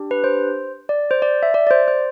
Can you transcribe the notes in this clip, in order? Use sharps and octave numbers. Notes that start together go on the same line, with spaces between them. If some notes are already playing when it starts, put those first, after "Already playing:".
Already playing: D4 G4
B4
C5
D5
C5
D5
E5
D5
D5
C5
C5